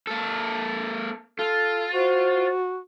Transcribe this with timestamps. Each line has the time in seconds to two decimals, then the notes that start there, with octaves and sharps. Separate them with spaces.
0.07 A#3 A4
1.39 F4 A4
1.93 F#4 C5